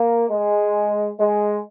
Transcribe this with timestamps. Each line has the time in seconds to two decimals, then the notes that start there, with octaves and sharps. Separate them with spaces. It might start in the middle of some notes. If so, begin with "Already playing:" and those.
Already playing: A#3
0.31 G#3
1.20 G#3